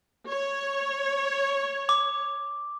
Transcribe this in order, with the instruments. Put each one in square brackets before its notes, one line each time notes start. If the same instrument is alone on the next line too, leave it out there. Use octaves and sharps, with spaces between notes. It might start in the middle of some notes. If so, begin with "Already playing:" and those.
[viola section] C#5
[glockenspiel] D6